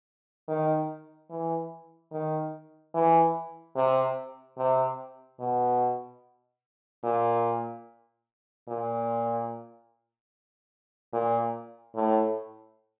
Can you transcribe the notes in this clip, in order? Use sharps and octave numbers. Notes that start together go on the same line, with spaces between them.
D#3
E3
D#3
E3
C3
C3
B2
A#2
A#2
A#2
A2